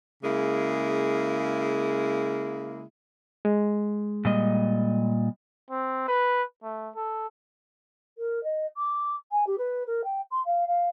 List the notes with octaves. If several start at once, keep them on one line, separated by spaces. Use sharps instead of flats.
C#3 G#3 A#3 E4
G#3
A#2 G3 D#5
C4
B4
A3
A4
A#4
D#5
D6
G#5
G4
B4
A#4
G5
C6
F5
F5